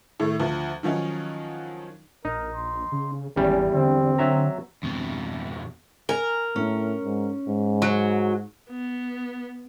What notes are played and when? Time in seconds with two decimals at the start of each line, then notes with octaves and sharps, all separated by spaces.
0.20 A2 D#3 A3
0.40 D2 F3
0.83 D#3 F3 F#3 C#4 D#4
2.25 A#1 D#4 A#4
2.55 C6
2.92 C#3
3.36 G#1 E2 G3 C#4
3.74 D3 C4
4.18 F#3 E5 A#5
4.83 F2 B2
6.09 A#4 G#5
6.56 A2 C#4
7.03 G#2
7.47 G#2
7.82 F#3
8.70 B3